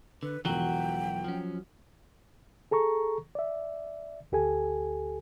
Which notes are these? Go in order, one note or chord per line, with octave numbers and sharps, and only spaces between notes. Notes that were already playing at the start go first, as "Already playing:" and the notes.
D3 B4
E1 E3 F#3 F4 F#4 G5 G7
F3 C#4
G#4 A4 A#5 C#6
D5 E5
D2 G4 A4 G#5